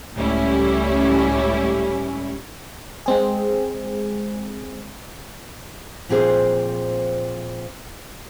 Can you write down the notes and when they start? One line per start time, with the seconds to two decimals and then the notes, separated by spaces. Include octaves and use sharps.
0.15 C#2 A2 G3 C#4 E4
3.06 G#3 C4 G#4
6.09 A#2 F3 C4 F4 G#4 C5